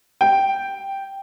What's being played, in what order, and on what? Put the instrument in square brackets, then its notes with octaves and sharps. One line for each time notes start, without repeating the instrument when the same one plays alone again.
[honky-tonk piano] G5